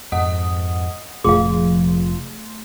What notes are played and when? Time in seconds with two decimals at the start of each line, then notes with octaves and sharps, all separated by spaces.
0.12 F2 G#2 D#5 F#5 D#6
1.24 F1 A#2 F3 A3 G#4 F5 C6